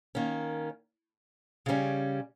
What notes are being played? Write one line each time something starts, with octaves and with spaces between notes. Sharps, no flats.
D#3 A#3 C#4
C#3 G3 C#4